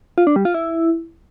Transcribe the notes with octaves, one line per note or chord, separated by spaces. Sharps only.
F4
D4
G3
F4
E4